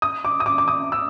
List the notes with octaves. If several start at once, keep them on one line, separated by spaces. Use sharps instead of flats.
D#6
D6
D#6
D6
D6
D#6
E6